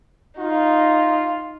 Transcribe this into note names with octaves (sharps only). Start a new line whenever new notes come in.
D#4 F4